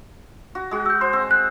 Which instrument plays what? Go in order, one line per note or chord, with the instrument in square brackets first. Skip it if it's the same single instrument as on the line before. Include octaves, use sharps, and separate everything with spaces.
[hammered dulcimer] F#4
G#3 F#4
[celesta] E6 G6
[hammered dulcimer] C5 [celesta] C6
[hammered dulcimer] C4
[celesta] F#6